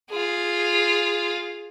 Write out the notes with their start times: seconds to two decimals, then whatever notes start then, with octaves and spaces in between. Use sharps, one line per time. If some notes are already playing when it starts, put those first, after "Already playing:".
0.11 F4 G#4